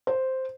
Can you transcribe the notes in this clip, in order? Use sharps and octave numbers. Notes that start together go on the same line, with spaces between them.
C5